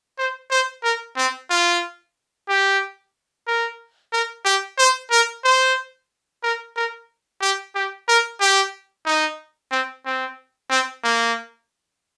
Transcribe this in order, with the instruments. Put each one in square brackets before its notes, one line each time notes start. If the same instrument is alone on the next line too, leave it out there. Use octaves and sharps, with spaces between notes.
[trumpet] C5
C5
A#4
C4
F4
G4
A#4
A#4
G4
C5
A#4
C5
A#4
A#4
G4
G4
A#4
G4
D#4
C4
C4
C4
A#3